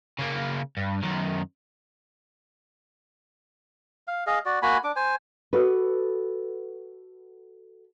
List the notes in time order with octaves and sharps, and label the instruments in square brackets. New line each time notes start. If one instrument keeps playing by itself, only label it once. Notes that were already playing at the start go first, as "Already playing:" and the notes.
[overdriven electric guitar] C#3 A#3
G2
F#2 D#3
[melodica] F5
G#4 D#5 F5
F#4 D5
A#3 F#4 G#5 B5
D4 D6
C5 G#5
[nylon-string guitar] F#4 A4 B4